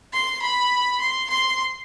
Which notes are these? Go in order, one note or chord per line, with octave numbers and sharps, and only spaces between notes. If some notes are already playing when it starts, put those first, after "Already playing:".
C6
B5
C6
C6